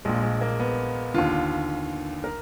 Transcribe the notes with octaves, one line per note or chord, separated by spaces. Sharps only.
A#1 A#2 G#3
G#3
A#3
B3
D#2 D3 F4
A#4